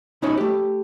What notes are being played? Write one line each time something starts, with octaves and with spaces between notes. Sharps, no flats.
B1 C#4 D#4 E4 C#5 D#5
A3 G4